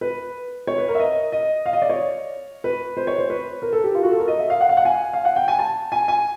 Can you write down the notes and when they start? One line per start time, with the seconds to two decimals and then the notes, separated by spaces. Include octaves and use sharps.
0.01 B4
0.67 C#5
0.78 B4
0.88 A#4
0.95 E5
1.00 D#5
1.32 D#5
1.66 F5
1.73 D#5
1.82 D5
1.89 C#5
2.64 B4
2.97 C5
3.07 C#5
3.18 C5
3.30 B4
3.62 A#4
3.73 A4
3.84 G4
3.95 F4
4.03 F#4
4.11 A4
4.19 A#4
4.28 D#5
4.39 E5
4.50 F5
4.61 F#5
4.69 F5
4.77 F#5
4.85 G#5
5.13 F5
5.25 F#5
5.36 G5
5.48 G#5
5.59 A5
5.92 G#5
6.08 G#5